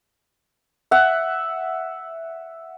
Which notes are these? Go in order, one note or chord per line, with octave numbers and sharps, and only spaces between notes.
E5 F#5